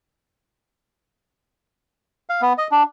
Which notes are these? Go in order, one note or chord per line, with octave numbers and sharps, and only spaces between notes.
F5
B3
D#5
D4